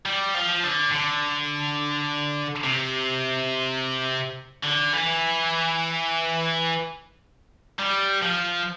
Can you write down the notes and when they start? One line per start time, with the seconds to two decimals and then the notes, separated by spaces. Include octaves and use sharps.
0.06 G3
0.35 F3
0.64 D3
0.92 D3
2.64 C3
4.64 D3
4.93 E3
7.79 G3
8.22 F3